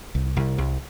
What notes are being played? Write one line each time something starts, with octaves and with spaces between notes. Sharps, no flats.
C2
C2
C2